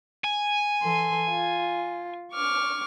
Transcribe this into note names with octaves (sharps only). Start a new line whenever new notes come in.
G#5
E3 A4 C6
F4
C#6 D6 F6